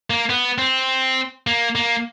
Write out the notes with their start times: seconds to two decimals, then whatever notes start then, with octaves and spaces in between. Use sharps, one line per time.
0.10 A#3
0.30 B3
0.58 C4
1.47 A#3
1.75 A#3